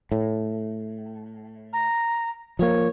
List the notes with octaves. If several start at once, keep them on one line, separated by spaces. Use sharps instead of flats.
A2
A#5
F3 A#3 C#5